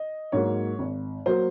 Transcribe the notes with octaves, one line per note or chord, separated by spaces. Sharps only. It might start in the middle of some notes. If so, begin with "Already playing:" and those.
Already playing: D#5
G#2 F#3 A#3 C#5
G#1
F#3 A#3 C5